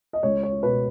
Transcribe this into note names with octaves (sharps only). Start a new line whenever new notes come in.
D#5
C#2 C#5
C#5
B2 B4